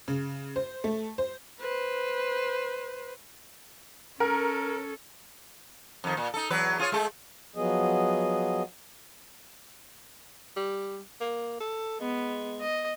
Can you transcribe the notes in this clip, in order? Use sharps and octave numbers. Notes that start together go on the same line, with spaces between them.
C#3
C5
A3
C5
B4 C5
C#4 A4 A#4
F2 D#3
A#2
D#4 A4
E2 F#3 B4
F4 G#4 C#5
G#3 A3
F3 F#3 B3 G#4 D#5
G3
A#3
A4
G#3 B3
D#5